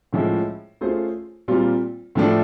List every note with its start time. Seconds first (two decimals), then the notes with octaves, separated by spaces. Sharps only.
0.13 A2 F3 G#3 C#4 E4
0.81 A3 C#4 F4 G#4 C5
1.48 A#2 G3 C4 F4
2.15 A2 F3 A3 D4